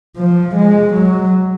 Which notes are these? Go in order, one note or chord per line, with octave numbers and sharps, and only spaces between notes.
F3
G#3
F#3